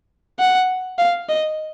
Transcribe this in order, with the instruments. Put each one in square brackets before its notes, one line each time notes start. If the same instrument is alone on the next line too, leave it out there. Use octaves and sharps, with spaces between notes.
[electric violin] F#5
F5
D#5